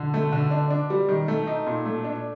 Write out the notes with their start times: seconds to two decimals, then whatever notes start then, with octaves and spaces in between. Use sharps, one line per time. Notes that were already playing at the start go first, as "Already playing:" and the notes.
Already playing: D3
0.14 A3
0.32 D3
0.51 D4
0.71 D4
0.90 G3
1.09 D#3
1.28 A3
1.47 D#4
1.67 A#2
1.85 A3
2.04 D4